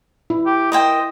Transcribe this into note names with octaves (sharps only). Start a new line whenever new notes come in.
E4
G4
A#4 C5 D#5 G5